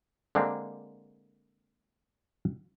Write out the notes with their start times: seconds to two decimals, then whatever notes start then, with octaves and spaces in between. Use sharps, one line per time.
0.35 D3 G#3 A#3 C4 D4